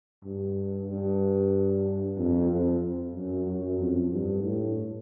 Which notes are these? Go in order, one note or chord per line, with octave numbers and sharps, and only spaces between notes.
G2
G2
F2
F2
F#2
F#2
F2
G2
A2